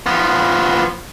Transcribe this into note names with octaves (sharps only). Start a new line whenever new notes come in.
F3 B3